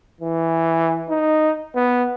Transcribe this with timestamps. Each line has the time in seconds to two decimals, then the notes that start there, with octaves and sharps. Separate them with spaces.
0.21 E3
1.09 D#4
1.75 B3